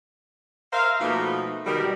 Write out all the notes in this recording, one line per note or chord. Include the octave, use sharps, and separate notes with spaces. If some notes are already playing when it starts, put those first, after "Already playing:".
A#4 C5 E5 F5
B2 F3 A3 A#3 D#4 B4
B2 D#3 G3